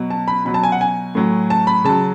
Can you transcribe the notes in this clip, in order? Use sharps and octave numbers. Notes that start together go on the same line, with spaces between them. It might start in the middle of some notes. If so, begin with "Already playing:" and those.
Already playing: B2 F#3
A5
B5
B2 F#3 B5
A5
G#5
F#5
G#5
A2 F#3
A5
B5
C#3 F#3 A5